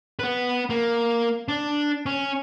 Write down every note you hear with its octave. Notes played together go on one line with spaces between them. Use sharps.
B3 B4
A#3
D4
C#4